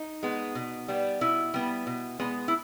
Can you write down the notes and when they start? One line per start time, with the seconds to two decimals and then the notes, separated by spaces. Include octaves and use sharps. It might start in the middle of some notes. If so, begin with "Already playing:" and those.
Already playing: D#4
0.23 G#3 B3
0.55 B2
0.88 G3 B3
1.21 B2 E4
1.54 G3 B3
1.87 B2
2.20 G#3 B3
2.48 E4